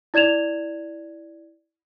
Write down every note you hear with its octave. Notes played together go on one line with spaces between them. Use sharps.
E4 D5 G#6 E7 F7